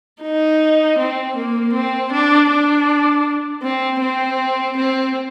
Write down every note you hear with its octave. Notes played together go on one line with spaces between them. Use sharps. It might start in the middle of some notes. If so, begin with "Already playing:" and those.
D#4
C4
A#3
C4
D4
D4
C4
C4
C4